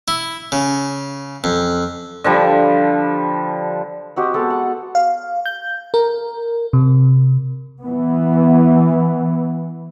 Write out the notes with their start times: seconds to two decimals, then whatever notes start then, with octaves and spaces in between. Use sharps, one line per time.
0.08 E4
0.52 C#3
1.44 F2
2.24 D3 F3 G3
4.16 C4 F#4 G4 D#5
4.34 G#3 B3 A4 A5
4.50 F#5
4.95 F5
5.46 G6
5.94 A#4
6.73 C3
7.82 E3 B3